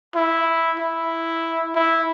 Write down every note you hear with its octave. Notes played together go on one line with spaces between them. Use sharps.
E4
E4
E4